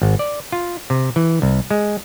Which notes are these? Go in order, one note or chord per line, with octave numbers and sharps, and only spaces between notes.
G#1
D5
F4
C3
E3
C2
G#3